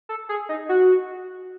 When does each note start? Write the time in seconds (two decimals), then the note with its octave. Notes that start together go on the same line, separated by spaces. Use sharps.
0.09 A4
0.29 G#4
0.49 D#4
0.69 F#4